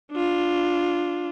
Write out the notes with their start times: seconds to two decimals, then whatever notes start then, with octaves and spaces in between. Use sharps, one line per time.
0.12 D4 F4